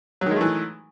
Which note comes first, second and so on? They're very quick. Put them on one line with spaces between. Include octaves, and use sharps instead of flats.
F#3 D#3 G#3 A3 E3